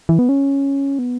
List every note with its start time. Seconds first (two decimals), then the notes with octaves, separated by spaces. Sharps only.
0.09 E3
0.19 B3
0.29 C#4
0.99 B3